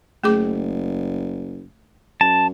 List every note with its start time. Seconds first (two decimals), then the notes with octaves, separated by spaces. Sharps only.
0.24 F#1 A3 G#4 D6
2.21 F#2 A5